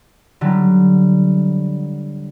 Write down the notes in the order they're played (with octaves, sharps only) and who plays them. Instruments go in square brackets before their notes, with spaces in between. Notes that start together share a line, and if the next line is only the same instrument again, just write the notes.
[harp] D3 F#3 G3